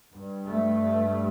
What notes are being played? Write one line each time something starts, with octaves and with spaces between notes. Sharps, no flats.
G2
A3